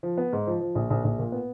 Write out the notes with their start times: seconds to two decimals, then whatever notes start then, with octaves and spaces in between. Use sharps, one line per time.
0.03 F3
0.18 B3
0.33 G#2
0.47 F3
0.61 F3
0.75 A#1
0.90 A#1
1.04 A#1
1.19 A#2
1.32 B3